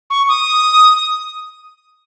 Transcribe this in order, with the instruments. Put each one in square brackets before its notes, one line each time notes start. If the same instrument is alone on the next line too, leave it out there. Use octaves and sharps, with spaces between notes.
[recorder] C#6
D#6